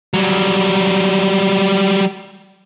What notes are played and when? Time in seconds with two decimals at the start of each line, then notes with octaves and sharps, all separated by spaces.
0.14 F#3 G3